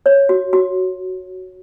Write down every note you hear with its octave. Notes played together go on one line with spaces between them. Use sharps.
C#5
F#4
F#4